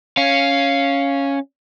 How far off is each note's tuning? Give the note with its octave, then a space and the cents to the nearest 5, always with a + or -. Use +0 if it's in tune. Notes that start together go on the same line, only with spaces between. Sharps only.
C#4 +0 F5 +0